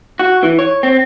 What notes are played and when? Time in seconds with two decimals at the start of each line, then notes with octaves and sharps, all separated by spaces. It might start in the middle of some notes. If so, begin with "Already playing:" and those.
0.19 F#4
0.43 E3
0.59 C#5
0.83 C4